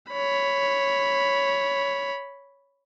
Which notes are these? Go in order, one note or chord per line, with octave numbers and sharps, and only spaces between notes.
C#5 B5